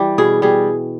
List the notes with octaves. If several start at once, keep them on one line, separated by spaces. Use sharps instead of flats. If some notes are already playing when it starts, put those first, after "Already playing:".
Already playing: E3 G3
B2 G#4
G3 G#4